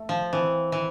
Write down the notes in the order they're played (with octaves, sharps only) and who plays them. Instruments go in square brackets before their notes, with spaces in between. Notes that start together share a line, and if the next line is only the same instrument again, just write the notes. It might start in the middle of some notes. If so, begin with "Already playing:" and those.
Already playing: [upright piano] A3
[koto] F3
[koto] E3 [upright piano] C4
[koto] E3